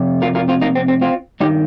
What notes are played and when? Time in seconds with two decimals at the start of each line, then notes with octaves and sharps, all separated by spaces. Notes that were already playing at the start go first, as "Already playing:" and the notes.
Already playing: F2 C3
0.22 F4 A#4
0.35 F4 A#4
0.48 C4 F4
0.61 A#3 D#4
0.75 C4
0.88 C4
1.01 C4 F4
1.40 G2 D#3 D#4 G4